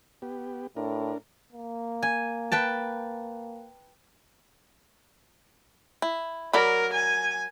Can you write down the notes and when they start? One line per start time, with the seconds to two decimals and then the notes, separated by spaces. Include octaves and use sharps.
0.22 B3 G4
0.77 A2 D4 A#4
1.52 A#3
2.02 G#5
2.52 B4 G5 A5
6.02 E4
6.53 F#3 A#4 D5 B5
6.93 G#5